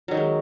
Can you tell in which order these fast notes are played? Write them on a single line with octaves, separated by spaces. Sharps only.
F#3 D#3 C#4 G#3